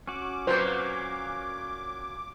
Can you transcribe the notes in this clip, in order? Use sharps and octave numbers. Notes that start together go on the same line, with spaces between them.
C#4 F#4 D6
A#2 F#3 A#3 B4 C5